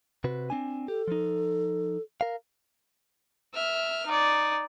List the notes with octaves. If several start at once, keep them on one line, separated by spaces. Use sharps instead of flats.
C3 F#4 B4
C4 D4 G#5
G4 A4
F3 D#4
A#4 F5
E5 F6
D#4 D5